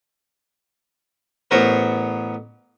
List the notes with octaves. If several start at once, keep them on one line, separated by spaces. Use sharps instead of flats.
A1 B3 A#4 C5 C#5